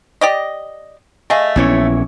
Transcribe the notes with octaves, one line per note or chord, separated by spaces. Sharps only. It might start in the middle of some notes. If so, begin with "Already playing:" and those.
G4 D5 D#5
A3 G#4 D#5 F5
A#1 E3 B3 C#4 E4 C#5